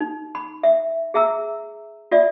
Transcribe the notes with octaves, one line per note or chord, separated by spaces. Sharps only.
D#4
B5
E5
G#4 E5 A#5 E6
F4 D5 E5